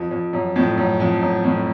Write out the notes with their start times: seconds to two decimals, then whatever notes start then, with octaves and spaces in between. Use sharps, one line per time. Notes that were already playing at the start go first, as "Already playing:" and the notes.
Already playing: F2
0.11 F2
0.33 F#2
0.56 F2 A2
0.78 F#2
1.00 F2
1.22 F#2
1.44 F2 A2